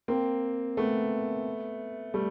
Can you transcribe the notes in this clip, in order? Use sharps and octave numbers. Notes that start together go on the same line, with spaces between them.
A#3 C4
A3 B3
G3 A3